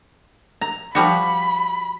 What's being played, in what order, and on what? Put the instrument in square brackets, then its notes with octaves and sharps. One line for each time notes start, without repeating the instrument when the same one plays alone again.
[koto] A#5
[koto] F3 G3 F#4 [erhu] B5